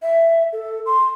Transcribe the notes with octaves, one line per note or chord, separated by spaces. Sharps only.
E5
A4
C6